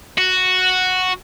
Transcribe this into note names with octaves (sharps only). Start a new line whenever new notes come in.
F#4